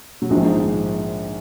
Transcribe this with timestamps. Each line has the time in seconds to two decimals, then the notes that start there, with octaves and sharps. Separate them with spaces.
0.22 F#3
0.30 A#1 G#2 D#3 F3 G#3